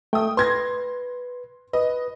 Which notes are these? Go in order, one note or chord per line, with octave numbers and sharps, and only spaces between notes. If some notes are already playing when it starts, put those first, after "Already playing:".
A3 G5 D#6
B4 C6 G#6 A#6
B4 D#5